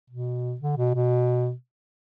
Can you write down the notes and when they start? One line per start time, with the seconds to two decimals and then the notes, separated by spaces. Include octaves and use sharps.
0.10 B2
0.61 D3
0.77 B2
0.94 B2